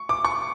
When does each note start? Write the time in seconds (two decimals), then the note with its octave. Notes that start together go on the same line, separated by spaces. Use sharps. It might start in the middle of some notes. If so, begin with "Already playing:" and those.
Already playing: C#6
0.09 D6
0.25 C#6